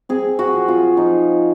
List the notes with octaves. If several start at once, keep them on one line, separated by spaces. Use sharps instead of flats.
C4 G#4
F#4
F3
F4
F3 D#4